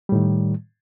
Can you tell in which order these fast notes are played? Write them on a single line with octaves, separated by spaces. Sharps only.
G3 A2 D#3